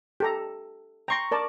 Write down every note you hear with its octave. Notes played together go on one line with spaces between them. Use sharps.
G4 A4 A#5
G5 A#5 C6 C#6 A#6
A#4 D5 A5